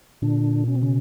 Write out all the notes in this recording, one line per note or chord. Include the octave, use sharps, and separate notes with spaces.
A#2 D3 D4
B2 C#4
C4
C#3 C#4